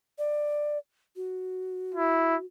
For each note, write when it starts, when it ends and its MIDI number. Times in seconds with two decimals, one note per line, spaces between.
0.19 0.78 74
1.16 2.45 66
1.94 2.36 64